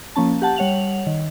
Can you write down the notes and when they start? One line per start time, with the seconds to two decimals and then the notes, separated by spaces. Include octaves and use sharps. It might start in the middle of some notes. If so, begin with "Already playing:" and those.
0.16 F3 A#3 C#4 A5
0.42 G4 F#5 A5
0.56 G3 C#5 F#5 F7 F#7
1.07 D#3